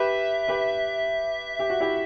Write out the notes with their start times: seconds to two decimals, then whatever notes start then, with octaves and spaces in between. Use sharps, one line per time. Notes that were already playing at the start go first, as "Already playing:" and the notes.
Already playing: G4 B4 E5
0.48 G4 B4
1.59 G4
1.70 F#4
1.80 E4 G4